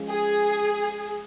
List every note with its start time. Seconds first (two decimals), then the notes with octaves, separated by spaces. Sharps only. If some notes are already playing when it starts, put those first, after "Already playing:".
Already playing: F3 G#3 C#4
0.09 G#4